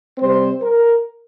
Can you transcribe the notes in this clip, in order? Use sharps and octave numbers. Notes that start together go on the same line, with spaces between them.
C3 G3 C4 C5
A#4